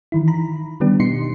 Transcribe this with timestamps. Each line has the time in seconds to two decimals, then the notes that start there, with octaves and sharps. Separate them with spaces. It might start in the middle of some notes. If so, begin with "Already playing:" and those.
0.12 D#3 E3 E4
0.28 A#5 B5
0.80 D3 D#3 G3 B3 D4 G4
1.00 B2 D#4 C6 C7 C#7